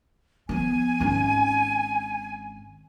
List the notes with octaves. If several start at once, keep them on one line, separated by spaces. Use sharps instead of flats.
F3 B3 G#5
G#1 C#4